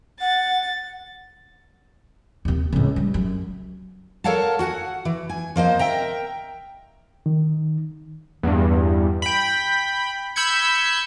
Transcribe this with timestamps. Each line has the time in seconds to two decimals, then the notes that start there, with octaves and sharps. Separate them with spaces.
0.21 F#5 A6
2.45 D#2 C3
2.73 C#2 A2
2.96 G3
3.14 F#2
4.24 A4 A#4 C#5 F5 F#5 A5
4.59 F#4 F#5 G#5
5.05 E3
5.29 G#5
5.56 F3 A#3 C5 D#5
5.79 A#4 E5 G5 A#5
7.26 D#3
8.43 E2 G2
9.22 G5 B5
10.36 B5 E6 G6 G#6 C#7